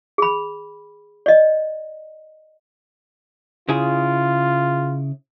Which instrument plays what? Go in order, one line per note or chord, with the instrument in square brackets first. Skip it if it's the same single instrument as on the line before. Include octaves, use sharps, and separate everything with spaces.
[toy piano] G#4 B5
D5 D#5
[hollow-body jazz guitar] C#3 E4 G#4 [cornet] F4